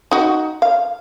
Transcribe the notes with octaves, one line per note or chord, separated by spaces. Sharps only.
D#4 F#4
F5